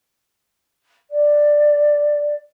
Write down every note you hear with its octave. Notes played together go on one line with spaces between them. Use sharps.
D5